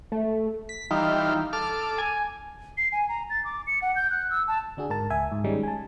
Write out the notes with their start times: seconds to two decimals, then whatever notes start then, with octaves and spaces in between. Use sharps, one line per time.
0.12 A3
0.69 B6
0.91 E3 G3 D#4 F4
1.53 A4 D6 F6
1.98 G#5
2.77 C7
2.92 G#5
3.09 A#5
3.30 A6
3.45 D6
3.67 C#7
3.82 F#5
3.95 G6
4.10 F#6
4.30 E6
4.48 A5
4.77 D3 D4 F#4 G#4
4.90 G#2 A#4 A5
5.10 C#2 E5 G#5
5.32 G#2
5.44 D#3 G3 G#3 C#4 D#4
5.63 G#5 A5